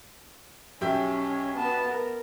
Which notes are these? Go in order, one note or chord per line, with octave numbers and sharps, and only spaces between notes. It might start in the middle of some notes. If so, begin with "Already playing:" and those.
B1 C#4 G4 E5
B3 A5
A#4